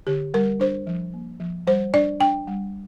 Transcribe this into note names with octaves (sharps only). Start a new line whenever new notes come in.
D3 G4
G3 A#4
D4 C5
F3
A#3
F3
G3 C5
D4 D5
D4 G5
G3